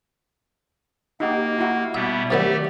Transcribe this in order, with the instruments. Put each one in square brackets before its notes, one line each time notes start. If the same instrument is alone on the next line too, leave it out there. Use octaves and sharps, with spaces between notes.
[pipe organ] A#3 [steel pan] D#4 F#4 G4
[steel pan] E4 F#4
[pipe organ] B2 G3 B3 [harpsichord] E5
[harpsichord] C3 D#3 F#3 [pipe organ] A3 G4 D5